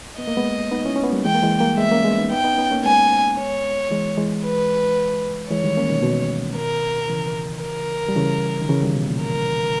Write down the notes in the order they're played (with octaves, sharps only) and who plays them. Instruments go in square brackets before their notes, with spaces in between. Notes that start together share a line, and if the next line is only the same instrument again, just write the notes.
[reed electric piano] B3 [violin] D#5
[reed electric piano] A#3
G#3 B3
B3 D#4
C#4 E4
C#4
B3
G3 A#3
[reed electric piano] E3 G#3 [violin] G5
[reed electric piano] A#3
E3 G#3
G3 A#3
[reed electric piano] G#3 B3 [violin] E5
[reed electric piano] A#3 C#4
G#3 B3
B3 D#4
[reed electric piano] B3 D#4 [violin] G5
[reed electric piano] B3 D#4
C#4
B3 D#4
A#3 C#4
[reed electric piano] G#3 B3 [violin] G#5
[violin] C#5
[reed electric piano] E3 G#3
E3 G#3
[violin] B4
[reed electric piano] E3 G#3 [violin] C#5
[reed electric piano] D#3 G3
A#3 C#4
B2 D#3
B2 D#3
[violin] A#4
[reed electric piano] C#3 E3
[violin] A#4
[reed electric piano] G3
C#3 E3
D#3
C#3 E3
D#3 G3
B2
A#2
[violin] A#4